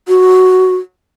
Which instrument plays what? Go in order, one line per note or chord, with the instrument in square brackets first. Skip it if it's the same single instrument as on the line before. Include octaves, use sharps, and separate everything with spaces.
[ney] F#4